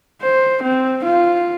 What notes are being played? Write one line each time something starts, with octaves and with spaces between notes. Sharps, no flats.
C5
C4
F4